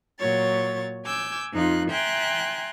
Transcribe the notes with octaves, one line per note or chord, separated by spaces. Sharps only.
A#2 F#3 C#5 A6
G#5 D6 E6 G6
F2 D#4 F4 F#6
E5 G5 G#5 A#5 C6 F#6